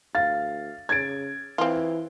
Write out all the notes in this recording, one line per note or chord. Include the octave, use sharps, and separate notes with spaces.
D2 F5 A6
C#3 G#6 A6 D7
E3 C4 F4